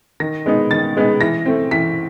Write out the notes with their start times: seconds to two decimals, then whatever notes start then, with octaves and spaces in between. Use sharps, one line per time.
0.20 D#3 A#6
0.46 G#3 B3 D#4
0.71 D#3 A6
0.97 G#3 B3 D#4
1.21 E3 A#6
1.46 A3 C4
1.71 E3 B6